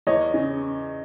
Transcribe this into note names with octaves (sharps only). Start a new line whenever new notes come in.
E2 C#5 D#5
C#3